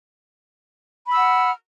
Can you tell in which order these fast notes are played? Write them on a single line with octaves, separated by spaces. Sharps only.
B5 E6 F#5 F6